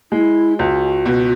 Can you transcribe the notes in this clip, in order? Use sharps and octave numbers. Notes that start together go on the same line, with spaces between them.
G#3 E4
C#2 F#4
B2